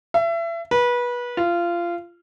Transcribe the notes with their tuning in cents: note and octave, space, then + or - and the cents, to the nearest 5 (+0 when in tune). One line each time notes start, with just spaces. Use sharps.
E5 +30
B4 -25
F4 -20